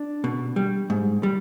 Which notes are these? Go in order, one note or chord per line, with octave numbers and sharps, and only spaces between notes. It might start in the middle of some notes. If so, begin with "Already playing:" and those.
Already playing: D4
B2
G3
G#2
G3